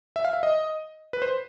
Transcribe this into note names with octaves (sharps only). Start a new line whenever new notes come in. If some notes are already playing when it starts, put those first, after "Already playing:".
E5
F5
E5
D#5
B4
C5